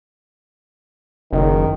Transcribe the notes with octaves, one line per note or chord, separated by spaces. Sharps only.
F#1 D#3